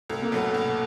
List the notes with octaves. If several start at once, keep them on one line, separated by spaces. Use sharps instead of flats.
C2 A3
A#3
B2 F#3 A3 B3
C2